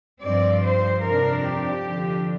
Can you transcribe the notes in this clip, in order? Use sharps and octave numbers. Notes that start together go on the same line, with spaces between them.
G2 F3 C4 D5
C5
F2 C3 F3 D4 A#4
G4
F2 D3 F3 D4